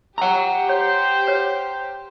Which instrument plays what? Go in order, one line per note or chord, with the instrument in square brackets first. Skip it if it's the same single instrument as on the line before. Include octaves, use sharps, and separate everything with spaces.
[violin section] G4 [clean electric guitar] F#5 A#5
[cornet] C5 [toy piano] C#5
[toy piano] B4 C#5